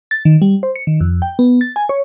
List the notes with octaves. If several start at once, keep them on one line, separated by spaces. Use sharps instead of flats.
A6
D#3
G3
C5
C#7
D#3
F2
G5
B3
A6
G#5
C#5